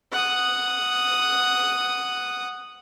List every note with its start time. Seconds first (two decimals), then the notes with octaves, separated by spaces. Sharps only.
0.12 F#5 D#6